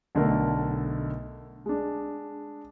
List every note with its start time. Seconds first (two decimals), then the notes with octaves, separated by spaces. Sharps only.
0.15 B1 D3 A3 A#4
1.66 G#3 D4